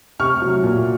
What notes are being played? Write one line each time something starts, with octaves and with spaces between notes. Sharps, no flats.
C3 C#6 F6
F#3
A#2